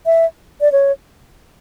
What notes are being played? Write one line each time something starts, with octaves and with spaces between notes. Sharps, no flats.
E5
D5
C#5